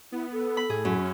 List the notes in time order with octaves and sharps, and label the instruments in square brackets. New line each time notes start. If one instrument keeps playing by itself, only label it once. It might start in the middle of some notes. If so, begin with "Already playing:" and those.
[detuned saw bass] B3 [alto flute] E4
[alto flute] A4
[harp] B5
[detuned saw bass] A2 [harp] G#4
[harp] F#2
[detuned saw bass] C#4